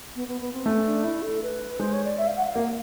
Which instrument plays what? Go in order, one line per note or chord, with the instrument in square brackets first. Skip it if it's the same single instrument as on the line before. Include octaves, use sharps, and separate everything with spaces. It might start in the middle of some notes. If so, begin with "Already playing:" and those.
[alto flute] B3
B3
B3
C4
[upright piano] A3 [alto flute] C#4
[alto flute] C#4
D4
E4
A4
B4
[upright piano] G#3 [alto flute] C5
[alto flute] C#5
D5
E5
F5
F#5
F5
[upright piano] A#3